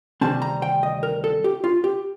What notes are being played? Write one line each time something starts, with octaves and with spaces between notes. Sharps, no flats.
D2 C3 D#3 G3 C4 A5
A#5
G5
D#5
A#4
A4
G4
F4
G4